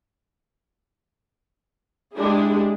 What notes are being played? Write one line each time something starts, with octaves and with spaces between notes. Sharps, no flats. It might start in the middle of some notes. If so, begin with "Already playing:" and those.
G#3 D4 E4 G4 G#4